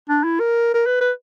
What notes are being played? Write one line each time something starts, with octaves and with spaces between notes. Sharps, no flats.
D4
E4
A#4
A#4
B4
B4